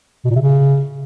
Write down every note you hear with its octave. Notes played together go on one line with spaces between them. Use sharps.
B2
A#2
C3
C#3